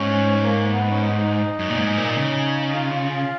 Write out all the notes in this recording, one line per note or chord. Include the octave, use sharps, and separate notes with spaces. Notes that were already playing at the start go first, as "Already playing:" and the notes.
Already playing: G#2 C#4
A#3
A#3
B3
C#4
D#4
F#2
A#2
G#2
A#2
C#3
D#4
F4